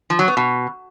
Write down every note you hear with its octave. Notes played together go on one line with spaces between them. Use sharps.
F3
F#3
B3
B2